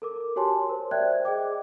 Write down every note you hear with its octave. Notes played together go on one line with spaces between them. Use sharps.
A4 A#4 D6
F#4 G4 C#5 G#5 A5 C6
A#4 C5
C5 D5 E5 G5 F#6 G#6
G#4 D#5 G5 D6